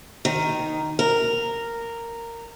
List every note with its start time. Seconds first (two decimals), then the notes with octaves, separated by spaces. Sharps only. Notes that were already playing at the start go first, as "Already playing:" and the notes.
0.25 D#3
0.99 A#4